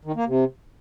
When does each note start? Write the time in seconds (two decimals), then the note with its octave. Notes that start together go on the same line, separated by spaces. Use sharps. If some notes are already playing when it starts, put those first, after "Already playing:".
0.05 D#3
0.16 A#3
0.27 C3